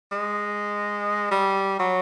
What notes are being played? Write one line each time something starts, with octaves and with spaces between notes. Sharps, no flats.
G#3
G3
F#3